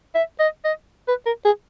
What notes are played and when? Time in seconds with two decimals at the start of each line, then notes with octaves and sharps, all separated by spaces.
0.15 E5
0.40 D#5
0.65 D#5
1.08 B4
1.26 A#4
1.45 G#4